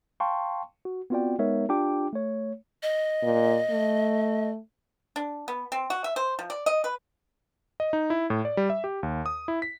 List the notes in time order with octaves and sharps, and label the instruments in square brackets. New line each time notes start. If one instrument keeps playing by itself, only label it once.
[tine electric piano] F5 G5 A5 C6 C#6
F#4
B3 C4 F4 F#4 D5 G5
G#3 B3 D#4 A#4 C#5 E5
D4 F4 G4 G5 D6
A3 C#5
[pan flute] D#5
[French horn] A#2
A3
[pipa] D4
B3
C4
F#4
E5
C5
F3
D5
D#5
B4
[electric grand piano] D#5
D#4
E4
A2
D5
G3
E5
G4
D#2
D#6
E4
B6